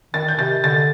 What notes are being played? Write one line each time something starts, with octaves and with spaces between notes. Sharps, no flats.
D#3 A6
G6
C3 A6
D3 A6